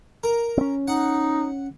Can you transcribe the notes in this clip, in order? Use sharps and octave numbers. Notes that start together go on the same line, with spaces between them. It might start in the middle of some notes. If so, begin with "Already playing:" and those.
A#4
C4 C#4
D#4 F#5